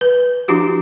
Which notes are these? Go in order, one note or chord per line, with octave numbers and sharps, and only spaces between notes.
B4
F3 D4 E4 F#4 G4